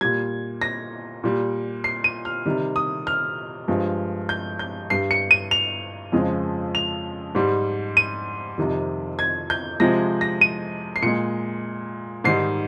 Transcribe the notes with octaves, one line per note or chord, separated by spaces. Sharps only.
A#2 G3 G#6
A#6
A#2 G3
C7
D#7
F6
C3 D#3 G3
D#6
F6
G2 F3 G#3
G6
G6
G2 G3 C7
C#7
D#7
F7
F2 C#3 F3 G#3
F7
G#2 G3
D#7
F2 C3 D#3 G3
G#6
G6
C3 F3 G#3 A#6
A#6
D#7
C7
A#2 G#3 C#7
G#2 D#3 G3 C7